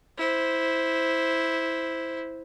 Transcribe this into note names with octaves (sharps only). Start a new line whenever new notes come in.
E4 C5